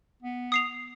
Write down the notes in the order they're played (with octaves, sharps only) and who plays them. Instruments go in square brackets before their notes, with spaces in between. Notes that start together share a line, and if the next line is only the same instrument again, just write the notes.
[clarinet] B3
[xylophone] D#6 C7 F7